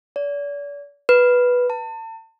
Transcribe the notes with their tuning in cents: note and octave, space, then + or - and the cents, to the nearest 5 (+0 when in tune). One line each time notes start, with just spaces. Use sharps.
D5 -40
B4 -5
A5 +35